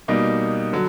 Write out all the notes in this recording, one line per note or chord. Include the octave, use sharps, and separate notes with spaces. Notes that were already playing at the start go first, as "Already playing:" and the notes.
B2 G3 A#3 D#4
D3 F#3